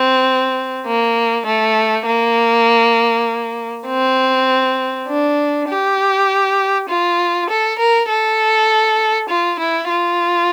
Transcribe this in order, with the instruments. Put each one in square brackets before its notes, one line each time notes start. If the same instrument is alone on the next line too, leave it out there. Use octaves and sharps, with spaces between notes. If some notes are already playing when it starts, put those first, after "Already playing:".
Already playing: [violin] C4
A#3
A3
A#3
C4
D4
G4
F4
A4
A#4
A4
F4
E4
F4